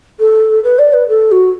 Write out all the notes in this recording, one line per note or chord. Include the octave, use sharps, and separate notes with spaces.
A4
B4
D5
B4
A4
F#4